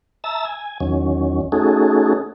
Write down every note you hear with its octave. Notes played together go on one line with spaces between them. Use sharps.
E5 A5 A#5 E6
G#5
E2 D#3 F#3 C#4
A3 C#4 D#4 F#4 G#4 A4